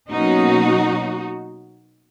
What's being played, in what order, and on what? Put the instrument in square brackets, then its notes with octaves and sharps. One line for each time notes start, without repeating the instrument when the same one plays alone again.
[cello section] B2 F#3 A#3 C#4 D#4 F#4